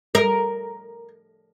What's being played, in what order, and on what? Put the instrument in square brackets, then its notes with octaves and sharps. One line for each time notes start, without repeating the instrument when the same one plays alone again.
[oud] A#4